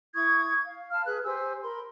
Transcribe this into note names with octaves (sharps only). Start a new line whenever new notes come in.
E4 C#6 D#6 G#6
F5
F5 A5 B5 F6
G#4 B4 F#6
G4 C5 G#5 E6
A#4 B5 C6